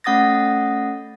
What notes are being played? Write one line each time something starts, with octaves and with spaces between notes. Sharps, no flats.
A3 C#4 F#5 D#6 A6 A#6